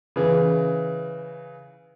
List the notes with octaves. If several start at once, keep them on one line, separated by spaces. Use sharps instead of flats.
C#3 E3